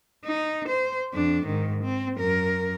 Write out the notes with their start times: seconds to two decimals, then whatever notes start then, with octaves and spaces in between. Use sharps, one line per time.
0.25 D#4
0.68 C5
1.14 F2 D4
1.46 G#2 D#3
1.84 C4
2.17 F#2 A#4